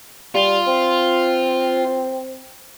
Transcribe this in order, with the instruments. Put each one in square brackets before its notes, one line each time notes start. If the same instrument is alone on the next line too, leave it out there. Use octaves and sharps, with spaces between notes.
[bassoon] G3 [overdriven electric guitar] F4
[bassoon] C4